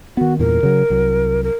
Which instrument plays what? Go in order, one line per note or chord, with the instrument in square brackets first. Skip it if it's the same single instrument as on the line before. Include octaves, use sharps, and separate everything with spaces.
[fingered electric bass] D#3 B3 [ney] F#4
[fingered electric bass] E2 G2 A#2 [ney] A#4
[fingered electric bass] C#3 F#3
C2 F#3
[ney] A#4